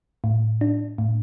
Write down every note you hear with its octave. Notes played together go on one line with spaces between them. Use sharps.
A2
D4
A2